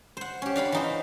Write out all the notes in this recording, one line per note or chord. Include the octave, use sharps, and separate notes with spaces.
C5 F#5
C#4 G4
D4 F5 F#5 B5
E3 D#4 C5